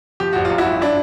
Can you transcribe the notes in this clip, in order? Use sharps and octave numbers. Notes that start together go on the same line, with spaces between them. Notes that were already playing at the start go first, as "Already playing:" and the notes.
F3 G4
A1 F#4
F4
F#2
E4 F#4
G#1
D4 E4